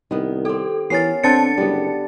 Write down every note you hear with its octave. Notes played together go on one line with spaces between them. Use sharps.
C2 D#3 B3
C4 G4 A4
E3 B3 C#4 A#4 A6 C7
D3 C4 A5 A6 C#7
F#1 G3 B3